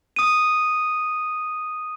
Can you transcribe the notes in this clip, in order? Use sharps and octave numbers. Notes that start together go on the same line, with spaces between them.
D#6 D#7